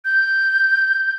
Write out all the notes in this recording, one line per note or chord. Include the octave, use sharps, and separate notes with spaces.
G6